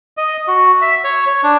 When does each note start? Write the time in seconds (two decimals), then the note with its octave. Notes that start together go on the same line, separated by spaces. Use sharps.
0.17 D#5
0.48 F#4
0.82 E5
1.04 C#5
1.27 C#5
1.43 D4